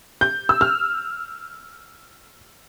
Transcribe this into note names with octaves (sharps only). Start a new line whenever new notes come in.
G6
E6
F6